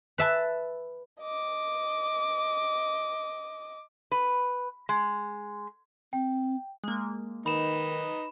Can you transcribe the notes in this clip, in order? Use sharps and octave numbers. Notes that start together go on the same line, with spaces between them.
B4 E5 A5
D#5 D6
B4
G#3
C4 G5
G#3 A#3
D#3 D#4 B4 B5 E7